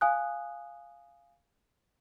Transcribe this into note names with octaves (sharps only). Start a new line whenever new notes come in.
F5 G#5 D#6 F#6